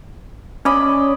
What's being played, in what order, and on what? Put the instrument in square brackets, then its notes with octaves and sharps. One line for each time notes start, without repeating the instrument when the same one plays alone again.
[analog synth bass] C#4 [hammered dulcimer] D5 D#5 B5